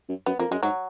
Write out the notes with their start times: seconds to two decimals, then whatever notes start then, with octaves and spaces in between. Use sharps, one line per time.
0.09 F#2
0.26 F#2 B3
0.39 F2 A#3
0.51 F#2 G#3
0.63 G#2 F#3